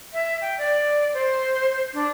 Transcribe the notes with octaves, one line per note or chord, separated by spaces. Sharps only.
E5
G5
D5
C5
D4